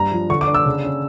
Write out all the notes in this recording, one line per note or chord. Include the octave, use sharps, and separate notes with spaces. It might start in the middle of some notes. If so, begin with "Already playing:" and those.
Already playing: G2 A#5
F3
D3 C#6
D6
D4
E6
C#3
C#4